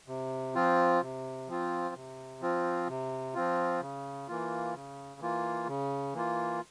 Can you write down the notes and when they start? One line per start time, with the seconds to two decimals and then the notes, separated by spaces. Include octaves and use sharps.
0.08 C3
0.55 F3 C4 F4
1.02 C3
1.48 F3 C4 F4
1.95 C3
2.42 F3 C4 F4
2.88 C3
3.34 F3 C4 F4
3.81 C#3
4.28 E3 A#3 F4
4.74 C#3
5.20 E3 A#3 F4
5.67 C#3
6.14 E3 A#3 F4